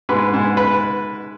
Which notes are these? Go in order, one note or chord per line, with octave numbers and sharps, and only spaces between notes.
G#2 B4
G#2
B4